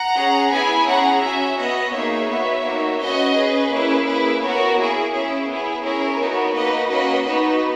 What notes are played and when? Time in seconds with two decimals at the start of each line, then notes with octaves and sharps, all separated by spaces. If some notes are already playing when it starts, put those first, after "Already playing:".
Already playing: F#5 A#5
0.17 C#4 G#4
0.52 B3 E4 G#4 G#5 B5
0.88 C#4 G#4 F#5 A#5
1.23 C#4 F#4 E5 G#5
1.58 B3 F#4 D#5 F#5
1.94 A#3 D#4 G#4 C#5 E5
2.29 B3 F#4
2.65 A#3 D#4 F#4
3.00 C#4 F#4 B4 D#5
3.35 C#4 G#4 B4
3.71 A#3 C#4 E4 G#4
4.06 A#3 E4 G#4 B4
4.42 B3 F#4 A#4 C#5
4.78 A#3 E4 G#4
5.13 C#4 E4 G#4
5.49 B3 E4 G#4
5.84 C#4 E4 G#4 A#4 C#5
6.19 B3 D#4 F#4
6.54 A#3 D#4 F#4 B4 D#5
6.90 A#3 C#4 F#4 B4 D#5
7.26 B3 D#4 F#4 B4